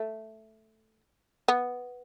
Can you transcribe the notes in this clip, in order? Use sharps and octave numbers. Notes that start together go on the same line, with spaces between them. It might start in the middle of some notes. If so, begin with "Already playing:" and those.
Already playing: A3
B3